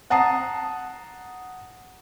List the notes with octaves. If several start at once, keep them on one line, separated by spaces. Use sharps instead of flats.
F#5 A5 A#5 D#6 C7